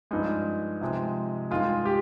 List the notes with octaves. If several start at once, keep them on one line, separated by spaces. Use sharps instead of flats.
G2 F3 G#3 D#4
C3 F3 G#3
G2 D#3 G#3 F4
G4